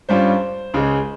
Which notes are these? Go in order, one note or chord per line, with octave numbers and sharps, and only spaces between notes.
G2 G3 C#4 F4 C5
C#2 C#3 G#3